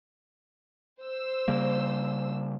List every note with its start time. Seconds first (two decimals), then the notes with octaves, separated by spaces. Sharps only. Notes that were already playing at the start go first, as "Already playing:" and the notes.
1.03 C5 E6
1.48 C#3 G3 A#3